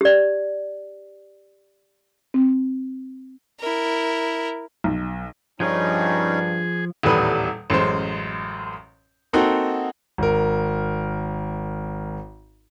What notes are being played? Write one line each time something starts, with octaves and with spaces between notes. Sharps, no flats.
G4 D5
C4
E4 A#4
B1
G2 F3 C#4 D#4 G#4 G6
D#1 E2 A2 G3 B4 D#6
A1 F#2 G#3 C5
A#3 C4 D#4 F#4 A4
G#1 A#4